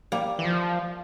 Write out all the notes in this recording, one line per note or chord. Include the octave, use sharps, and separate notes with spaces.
G3 A#3
E3
F3